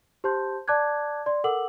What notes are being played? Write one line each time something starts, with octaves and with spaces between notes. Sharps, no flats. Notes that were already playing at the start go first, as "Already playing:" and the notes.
G4 C5 A5 C6 G6
D5 A5 D6 F#6 G#6
D5 C6
A4 A#4 F#5 D6 E6 F#7